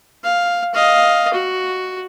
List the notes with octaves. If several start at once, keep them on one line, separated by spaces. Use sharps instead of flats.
F5
D#5 F5
F#4